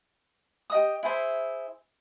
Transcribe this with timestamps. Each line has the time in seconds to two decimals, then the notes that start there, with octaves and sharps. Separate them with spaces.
0.70 G4 D#5 D#6
1.03 E4 G#4 C5 E5